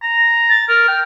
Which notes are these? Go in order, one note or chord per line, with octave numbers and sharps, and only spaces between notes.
A#5
A6
A#4 F6
G5